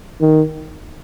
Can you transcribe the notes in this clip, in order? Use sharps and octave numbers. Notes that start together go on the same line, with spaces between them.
D#3